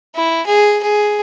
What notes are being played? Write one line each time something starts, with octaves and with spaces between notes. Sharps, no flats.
E4
G#4
G#4